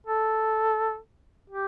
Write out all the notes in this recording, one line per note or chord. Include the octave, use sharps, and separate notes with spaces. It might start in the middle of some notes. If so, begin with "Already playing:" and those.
A4
G4